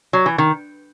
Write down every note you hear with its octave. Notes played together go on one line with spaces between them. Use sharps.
F#3
E3
D#3